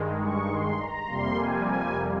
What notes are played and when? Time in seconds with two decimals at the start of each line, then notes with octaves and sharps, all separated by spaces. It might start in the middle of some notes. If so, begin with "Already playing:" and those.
Already playing: G2 D#3 G#3
0.20 C#6
0.48 C6
0.78 A#5
1.07 F2 C3 G3 A#3 C6
1.36 G#5
1.65 G#5